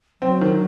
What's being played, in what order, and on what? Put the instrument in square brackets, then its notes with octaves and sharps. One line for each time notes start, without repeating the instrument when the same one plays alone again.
[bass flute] F#3 [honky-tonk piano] C4
[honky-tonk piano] D#3